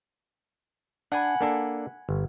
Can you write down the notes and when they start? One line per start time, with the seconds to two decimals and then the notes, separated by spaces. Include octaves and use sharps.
1.12 D4 F#5 G#5 B5
1.41 A#3 D4 A4
2.09 G1